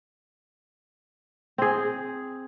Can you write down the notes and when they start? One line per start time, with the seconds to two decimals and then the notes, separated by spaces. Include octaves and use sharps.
1.58 C4 G#4